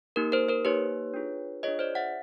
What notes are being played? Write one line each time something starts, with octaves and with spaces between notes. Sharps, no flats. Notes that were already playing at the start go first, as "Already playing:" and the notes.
A#3 D#4 G4 A#4
A#4 C5
A#4 C5
A#3 D#4 G4 B4 C#5
D4 F4 G#4
D4 F4 G#4 C#5 D#5
C5 D5
E5 F#5